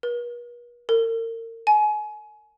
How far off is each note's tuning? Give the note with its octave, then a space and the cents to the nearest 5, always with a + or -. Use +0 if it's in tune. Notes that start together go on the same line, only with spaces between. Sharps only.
B4 -45
A#4 -35
G#5 +30